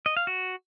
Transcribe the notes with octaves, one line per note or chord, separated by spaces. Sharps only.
D#5
F5
F#4